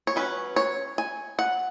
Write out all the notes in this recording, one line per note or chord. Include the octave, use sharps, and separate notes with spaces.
C#5
F#3 C#4 B4
C#5
G#5
F#5